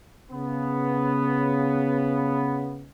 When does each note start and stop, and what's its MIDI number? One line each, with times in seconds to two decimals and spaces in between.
0.32 2.86 49
0.32 2.86 59